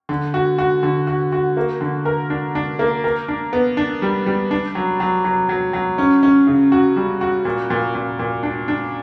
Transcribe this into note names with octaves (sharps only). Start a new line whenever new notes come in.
D3
F#4
F#4
D3
F#4
F#4
A#3
D3
A#4
D4
D4
A#3
A#4
D4
B3
D4
G3
G3
D4
F#3
F#3
F#3
F#3
F#3
C#4
C#4
C#3
F#4
G3
F#4
A#2
A#2
A#2
A#2
D4
D4